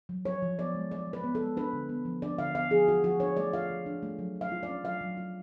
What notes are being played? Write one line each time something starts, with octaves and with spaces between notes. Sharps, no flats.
F#3
F3 C#5
F3
B3 D5
G#3
F3 D5
F3
B4
B3
A4
G#3
D4 B4
D3
B3
F3
D4 D5
D3 F5
B3 F5
F3 G#4
F4 F#4
F3 F#4
D4 C#5
A3 D5
F4 F5
F3
D4
A3
F#3
F#3
F5
F4
D5
C#4
F#3 F5
F#3
F4